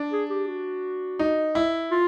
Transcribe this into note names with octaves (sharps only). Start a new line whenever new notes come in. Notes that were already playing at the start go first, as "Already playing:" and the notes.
Already playing: D4
G#4
G4
F#4
D#4
E4
F4